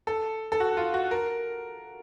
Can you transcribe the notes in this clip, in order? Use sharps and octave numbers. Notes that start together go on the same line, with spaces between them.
A4
A4
F#4
F4
F#4
A#4